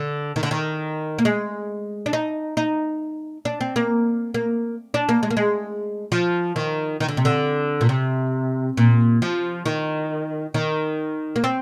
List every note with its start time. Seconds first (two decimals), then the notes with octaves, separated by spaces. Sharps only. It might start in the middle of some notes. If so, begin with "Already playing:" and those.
Already playing: D3
0.36 D#3
0.43 D3
0.51 D#3
1.19 A#3
1.25 G#3
2.06 D4
2.13 D#4
2.57 D#4
3.45 D4
3.61 C4
3.76 A#3
4.34 A#3
4.94 D4
5.09 A#3
5.23 G#3
5.31 A#3
5.37 G#3
6.12 F3
6.56 D#3
7.00 D#3
7.08 D3
7.17 C3
7.25 D3
7.81 A#2
7.89 C3
8.77 A#2
9.22 F3
9.66 D#3
10.54 D#3
11.36 A#3
11.44 C4